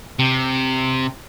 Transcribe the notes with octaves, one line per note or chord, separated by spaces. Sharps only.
C3